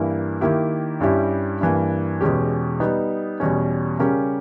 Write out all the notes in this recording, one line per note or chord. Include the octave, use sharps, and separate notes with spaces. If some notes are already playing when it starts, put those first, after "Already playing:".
Already playing: G2 E3 A#3 E4
D#3 A#3 E4 G4
G2 G3 C#4 E4 G4
G2 E3 A#3
E2 B2 G#3 C#4 G4
G3 B3 D#4
E2 B2 G3 C#4
C#3 G3 C#4 G4 A#4